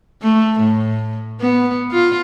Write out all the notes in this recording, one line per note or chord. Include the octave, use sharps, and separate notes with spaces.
A3
A2
B3
F4